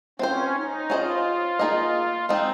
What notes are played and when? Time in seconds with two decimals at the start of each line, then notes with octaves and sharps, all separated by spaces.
0.19 C4 C#4 F4 C5
0.55 D#4
0.89 C#4 F4 G#4 C5 D#5
1.59 A#3 D#4 G#4 D#5
2.29 G#3 C4 D#4